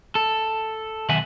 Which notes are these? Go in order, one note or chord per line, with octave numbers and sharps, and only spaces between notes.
A4
B1 D#3 E5 F#5 G#5